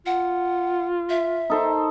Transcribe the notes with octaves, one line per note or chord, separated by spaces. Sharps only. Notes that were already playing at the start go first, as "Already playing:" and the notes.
F4 F#5
E5
D#4 A4 C5